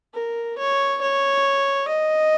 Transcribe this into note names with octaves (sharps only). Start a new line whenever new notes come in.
A#4
C#5
C#5
D#5